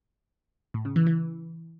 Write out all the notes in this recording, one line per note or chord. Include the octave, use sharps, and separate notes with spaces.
A2
C#3
E3
E3